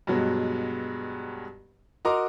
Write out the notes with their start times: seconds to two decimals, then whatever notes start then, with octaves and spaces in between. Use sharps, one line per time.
0.07 G2 B2 F#3 G#3
2.05 F#4 A#4 D#5 A#5 C6 D6